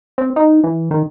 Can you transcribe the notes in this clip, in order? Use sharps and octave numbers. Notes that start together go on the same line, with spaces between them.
C4
D#4
E3
D#3